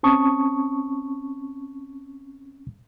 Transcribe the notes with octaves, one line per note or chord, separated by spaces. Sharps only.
C4 C#4 A5 C#6 D#6